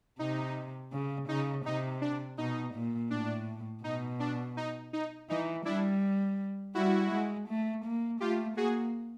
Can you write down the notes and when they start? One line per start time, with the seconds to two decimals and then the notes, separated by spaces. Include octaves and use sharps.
0.19 C3 D#4
0.92 C#3
1.29 C#3 D#4
1.65 C3 D#4
2.02 D4
2.38 B2 D#4
2.74 A#2
3.10 A2 D4
3.84 B2 D#4
4.20 D4
4.57 D#4
4.93 D#4
5.30 E3 D#4
5.65 G3 D4 E4
6.75 G3 E4 F#4
7.12 G#3
7.49 A3
7.85 A#3
8.20 A3 F4 G4
8.57 A#3 F#4 G#4